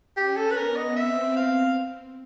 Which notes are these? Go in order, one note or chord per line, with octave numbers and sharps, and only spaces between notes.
C#4 G4
A4
B4
B3 A#4
D#5
C4 E5
F5